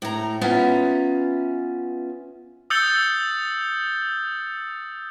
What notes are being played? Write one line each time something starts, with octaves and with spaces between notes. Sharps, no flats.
A2 A#5
B3 C#4 F4 E5 A#5
D#6 E6 G6 A6 C#7 G7